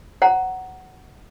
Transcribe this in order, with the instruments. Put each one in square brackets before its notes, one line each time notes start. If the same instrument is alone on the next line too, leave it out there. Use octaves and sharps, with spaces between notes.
[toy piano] C5 F#5 A#5